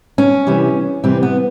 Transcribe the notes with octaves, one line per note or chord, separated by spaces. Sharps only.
C#4
C3 E3 G3
C3 E3 G3 C4
B3